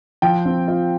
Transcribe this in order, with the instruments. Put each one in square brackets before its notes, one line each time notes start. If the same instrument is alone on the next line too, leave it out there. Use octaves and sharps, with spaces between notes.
[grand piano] F3 G5
C4
F4